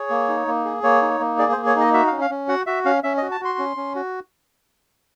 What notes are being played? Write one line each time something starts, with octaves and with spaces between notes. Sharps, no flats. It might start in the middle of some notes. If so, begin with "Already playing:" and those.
Already playing: G#4 C#5
A#3
D#4
A#3
G#4
A#3 C#5
D#4
A#3
G#4 D5
C5
A#3
C#5
D#4 D#5
F#4 E5
C#4 F5
F5
C#4
F#4 F#5
F#4 E5
C#4 F5
C#4 E5
F#4 D#5
A5
F#4 C6
C#4
C#4
F#4